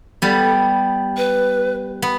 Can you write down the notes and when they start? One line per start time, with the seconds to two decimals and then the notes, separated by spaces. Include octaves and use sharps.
0.22 G3 B3 A4
1.17 B4
2.02 B3